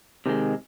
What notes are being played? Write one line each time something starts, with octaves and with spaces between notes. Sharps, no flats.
C3 D#3 G#3